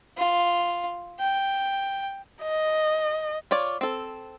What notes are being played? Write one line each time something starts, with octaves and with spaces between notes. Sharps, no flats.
F4
G5
D#5
F4 C#5 D5
C4 A4